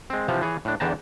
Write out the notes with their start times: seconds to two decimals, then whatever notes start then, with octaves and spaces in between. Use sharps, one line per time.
0.10 G#3 C4
0.28 C3 E3 F3 C5 F5
0.41 E3 G#4 C#5
0.65 A2 D4
0.80 E2 D3 E3 G5 A5 A#5